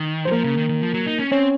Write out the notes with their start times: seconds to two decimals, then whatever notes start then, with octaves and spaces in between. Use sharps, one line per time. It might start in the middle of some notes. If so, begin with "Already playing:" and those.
Already playing: D#3
0.25 F#3 C5
0.31 F3 A#3 A#4
0.44 C#3
0.57 D#3
0.69 D#3
0.82 F3
0.94 F#3
1.07 D#4
1.19 C#4
1.32 C4 C#4 C#5